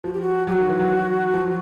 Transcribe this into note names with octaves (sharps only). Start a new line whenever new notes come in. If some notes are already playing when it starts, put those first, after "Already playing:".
F3 F#4
G4
F#4
F#3 G4
F#4
D#3
E3
F#3
F3